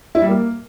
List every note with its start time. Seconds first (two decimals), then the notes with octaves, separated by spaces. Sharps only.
0.15 E4
0.22 G3
0.29 A#3